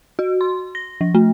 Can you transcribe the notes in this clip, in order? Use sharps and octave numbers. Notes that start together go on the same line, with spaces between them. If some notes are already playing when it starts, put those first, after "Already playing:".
F#4
C6
A#6
F3
A3